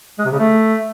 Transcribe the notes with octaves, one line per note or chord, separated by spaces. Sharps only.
G#3
C3
C#3
A3